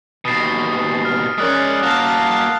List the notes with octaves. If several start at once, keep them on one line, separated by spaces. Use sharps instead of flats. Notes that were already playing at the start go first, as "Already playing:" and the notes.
D#2 B2 D#6 A6 C7
F6
G#3 C#4 A#4 D5 D#6 F#6
A#3 F#4 F5 A5 F6